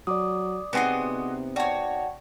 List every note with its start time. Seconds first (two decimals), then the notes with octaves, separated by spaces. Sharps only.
0.07 F#3 D5 D6 D#6
0.73 C3 B3 C4 D#4 F#4 G#4 D#5
1.56 F#4 C#5 D5 G5 A5